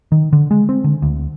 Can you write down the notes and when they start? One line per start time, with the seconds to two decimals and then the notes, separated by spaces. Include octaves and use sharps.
0.12 D#3
0.33 D3
0.51 G#3
0.69 C4
0.84 D3
1.02 D2